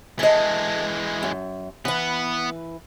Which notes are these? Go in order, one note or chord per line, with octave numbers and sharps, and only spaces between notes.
E3 G#3 A4 D#5
F#2
E3 B3 B4